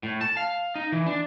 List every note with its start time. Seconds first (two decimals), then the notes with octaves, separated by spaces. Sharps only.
0.03 A2
0.21 A5
0.37 F5
0.75 D#4
0.92 E3
1.06 D4